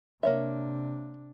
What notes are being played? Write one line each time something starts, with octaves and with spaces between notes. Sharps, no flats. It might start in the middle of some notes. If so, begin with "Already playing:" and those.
C3 A#3 D4 C#5 E5